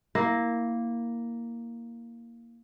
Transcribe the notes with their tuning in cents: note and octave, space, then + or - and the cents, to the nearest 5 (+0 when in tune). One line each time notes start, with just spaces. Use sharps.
A#3 +0 E4 -15